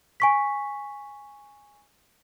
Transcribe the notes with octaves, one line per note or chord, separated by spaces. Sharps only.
G#5 C#6 B6